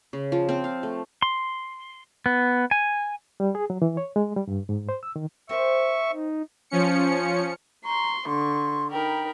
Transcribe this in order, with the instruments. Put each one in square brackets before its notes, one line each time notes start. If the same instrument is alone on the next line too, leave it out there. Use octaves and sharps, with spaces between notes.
[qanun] C#3
F3
C4
F5
A3
[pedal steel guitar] C6
B3
G#5
[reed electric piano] G3
G#4
F#3
E3
C#5
G#3
G3
G2
G#2
C5
E6
D#3
[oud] C4 A#4 C5 [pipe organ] E5 C#6
[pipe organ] D#4
[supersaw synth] F3 C#4 C#7
[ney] A#5 [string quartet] C6 C#6
[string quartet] D3 C#6 [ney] C6
[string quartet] D#4 A#4 B5 [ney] G5